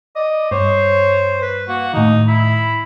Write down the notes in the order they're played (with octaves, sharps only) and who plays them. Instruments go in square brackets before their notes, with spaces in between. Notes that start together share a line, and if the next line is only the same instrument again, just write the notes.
[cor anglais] D5 [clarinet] D#5
[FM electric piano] G2 [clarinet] C5 [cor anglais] C#5
[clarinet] B4
[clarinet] A#3 [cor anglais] F#4
[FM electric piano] A2 D#3 [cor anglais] D#4
[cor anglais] E4 [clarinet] B5